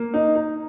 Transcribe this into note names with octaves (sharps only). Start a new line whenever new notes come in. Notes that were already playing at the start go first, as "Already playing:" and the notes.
Already playing: A#3
D#4
D#4